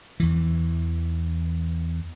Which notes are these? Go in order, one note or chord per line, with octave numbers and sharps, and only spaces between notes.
E2 E3